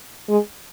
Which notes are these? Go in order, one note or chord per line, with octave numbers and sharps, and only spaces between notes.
G#3